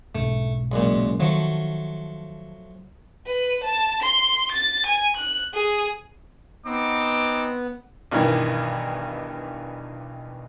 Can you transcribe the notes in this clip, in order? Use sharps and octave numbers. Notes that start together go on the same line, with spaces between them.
B1 G#2 A3
C#2 F#2 A#2
D#3 F3 F#3 A3
B4
A5
C6
A6
G#5
F#6
G#4
B3 C4 D#4 D6
B1 G2 D#3 E3